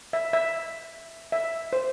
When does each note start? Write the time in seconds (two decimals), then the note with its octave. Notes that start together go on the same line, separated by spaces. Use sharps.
0.13 E5
0.33 E5
1.32 E5
1.73 C5